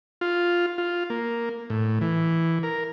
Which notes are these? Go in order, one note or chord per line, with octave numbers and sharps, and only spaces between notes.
F4
F4
A#3
A2
E3
A#4